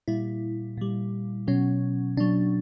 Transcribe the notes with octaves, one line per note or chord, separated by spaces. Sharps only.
A#2 G3 E4
A#2 G3
B2 F#3 C#4
B2 F#3 D4